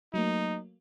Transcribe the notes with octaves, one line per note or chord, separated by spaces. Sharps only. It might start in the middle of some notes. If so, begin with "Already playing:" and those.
F#3 A3 A#3 D#4